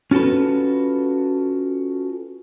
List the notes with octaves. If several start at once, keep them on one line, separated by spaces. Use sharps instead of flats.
C#4 F4 F#4 A4 B4